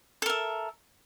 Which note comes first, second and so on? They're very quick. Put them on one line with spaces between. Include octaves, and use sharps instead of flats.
A4 A#4 E5